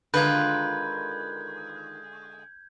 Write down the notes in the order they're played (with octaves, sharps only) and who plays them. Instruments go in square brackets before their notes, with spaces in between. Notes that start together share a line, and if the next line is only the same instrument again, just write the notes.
[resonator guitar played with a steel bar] D3 G#3 [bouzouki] D#3 F4 A#4 [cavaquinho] B4 [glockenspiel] G6 G#6